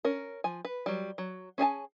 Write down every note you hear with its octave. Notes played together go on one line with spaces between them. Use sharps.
C#4 A#4
F3 G#5
B4
F#3 G3
F#3
C#4 G#4 G#5 A5